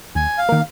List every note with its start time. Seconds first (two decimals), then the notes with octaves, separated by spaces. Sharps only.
0.15 D#2 G#5
0.38 F5
0.49 D#3 A#3